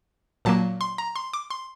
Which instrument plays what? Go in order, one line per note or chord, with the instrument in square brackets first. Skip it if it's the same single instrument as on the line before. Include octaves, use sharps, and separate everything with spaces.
[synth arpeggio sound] A#2 F#3 A#3 A5
C6
A#5
C6
D6
C6